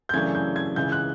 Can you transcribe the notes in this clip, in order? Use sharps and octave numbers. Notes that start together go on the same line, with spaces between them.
G6
F#2 C#3 E3 A3 D4 G#6
G6
G#6
C#2 C#3 E3 G6
F#6